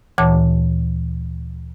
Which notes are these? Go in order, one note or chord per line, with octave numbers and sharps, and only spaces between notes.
D2 A#2 E3 C#5 A5 D6